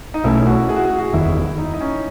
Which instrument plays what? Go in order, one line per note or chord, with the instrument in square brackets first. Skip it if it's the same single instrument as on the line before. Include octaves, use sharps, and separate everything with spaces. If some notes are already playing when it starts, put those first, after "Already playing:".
[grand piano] D#4
[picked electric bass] B1 B2 A3 C#4 [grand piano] E4
[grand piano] F#4
G#4
F#4
G#4
F#4
[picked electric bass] F#1 E2 D#3 [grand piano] E4
[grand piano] E4
D#4
D#4
C#4